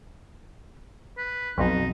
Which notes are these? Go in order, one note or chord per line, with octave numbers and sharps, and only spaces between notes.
B4
B1 F2 B2 D#4